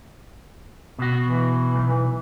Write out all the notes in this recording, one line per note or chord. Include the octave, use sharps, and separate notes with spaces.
B2 F#4
E3
B1